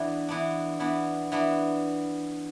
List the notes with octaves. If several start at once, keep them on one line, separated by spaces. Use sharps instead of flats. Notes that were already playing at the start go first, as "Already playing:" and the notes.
Already playing: E3 B3 D4
E3 B3 D4
E3 B3 D4
E3 B3 D4